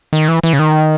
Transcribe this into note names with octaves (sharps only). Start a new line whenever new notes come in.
D#3
E3
E3
C#3
D#3